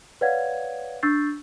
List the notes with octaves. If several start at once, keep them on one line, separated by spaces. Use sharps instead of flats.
B4 C#5 D5 F5 F#5 G#6
D4 C#6 E6 G6 A6 C7